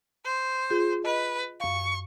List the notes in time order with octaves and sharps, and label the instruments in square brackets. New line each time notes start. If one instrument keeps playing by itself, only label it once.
[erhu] C5
[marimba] F4 G#4 G6
[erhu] B4 [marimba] D#5
[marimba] F#2 F5 [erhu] C#6